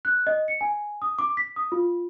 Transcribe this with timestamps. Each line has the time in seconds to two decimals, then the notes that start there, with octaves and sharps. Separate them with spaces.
0.05 F#6
0.27 D#5
0.48 C#7
0.61 G#5
1.02 D#6
1.19 D6
1.37 B6
1.56 D#6
1.72 F4